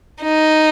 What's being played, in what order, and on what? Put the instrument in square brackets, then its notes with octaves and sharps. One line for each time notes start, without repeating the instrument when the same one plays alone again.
[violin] D#4